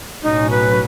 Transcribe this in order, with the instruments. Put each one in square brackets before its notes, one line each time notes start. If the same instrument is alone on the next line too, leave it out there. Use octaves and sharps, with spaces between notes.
[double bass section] B1 A2 F#3 C#4 [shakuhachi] D#4
[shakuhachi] B4